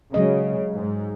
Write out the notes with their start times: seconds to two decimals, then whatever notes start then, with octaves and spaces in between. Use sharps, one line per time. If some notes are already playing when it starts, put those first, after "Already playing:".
0.14 C#3 F#3 G#3 D#5
0.74 G#2